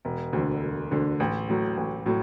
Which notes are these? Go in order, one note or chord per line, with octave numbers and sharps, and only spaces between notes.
E1
D2 D3
E1
D2 D3
A1
A2 F#3
A1
A2 F#3